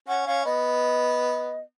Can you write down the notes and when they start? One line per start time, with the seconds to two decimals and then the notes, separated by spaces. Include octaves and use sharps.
0.08 C#4 F#5
0.26 C#4 F5
0.45 B3 D#5